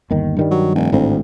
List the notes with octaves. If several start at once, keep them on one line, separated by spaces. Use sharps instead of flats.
G1 D#2 D#3
G2 D#3 G3
F#3
F1
G#1 D2 A2 C4